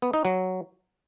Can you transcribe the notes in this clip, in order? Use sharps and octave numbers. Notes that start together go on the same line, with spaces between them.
B3
D#4
F#3